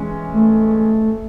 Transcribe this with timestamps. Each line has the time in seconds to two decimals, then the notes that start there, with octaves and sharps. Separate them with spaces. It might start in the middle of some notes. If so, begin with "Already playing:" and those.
Already playing: E3 G#3 C#4
0.33 A3